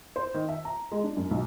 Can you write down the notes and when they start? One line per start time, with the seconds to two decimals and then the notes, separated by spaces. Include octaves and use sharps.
0.16 C5
0.34 D#3
0.49 E5
0.65 A#5
0.92 G#3
1.04 D4
1.17 F#2
1.31 B1